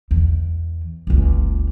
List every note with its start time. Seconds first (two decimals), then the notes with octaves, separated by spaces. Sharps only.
0.11 E2
1.07 F#1 C#2